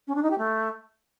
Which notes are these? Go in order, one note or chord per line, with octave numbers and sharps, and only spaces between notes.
C#4
D4
D#4
G4
A3